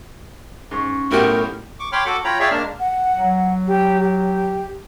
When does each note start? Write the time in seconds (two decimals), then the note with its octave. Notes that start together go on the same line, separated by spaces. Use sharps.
0.71 G#2 C#4 C#6
1.11 B1 A2 F#4 G4 A#4
1.80 C#6 D6
1.92 C#5 G5 B5 C6 D6 F6
2.06 F#4 A4 F#5 D6
2.24 F4 C#5 G5 A#5 B5
2.40 G#4 C#5 D5 E5 F5 G5
2.51 G#3 A#3 D4 A5 F6
2.79 F#5
3.15 F#3
3.67 G4
4.00 G4